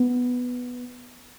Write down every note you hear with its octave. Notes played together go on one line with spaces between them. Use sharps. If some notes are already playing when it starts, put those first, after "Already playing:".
Already playing: B3